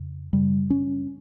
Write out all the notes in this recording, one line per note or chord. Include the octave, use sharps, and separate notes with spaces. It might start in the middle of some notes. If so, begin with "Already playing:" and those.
Already playing: F2 C#3
F#2 C#3 G3
C#4